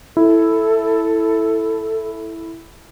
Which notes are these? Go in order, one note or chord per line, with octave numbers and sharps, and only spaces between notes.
E4 A4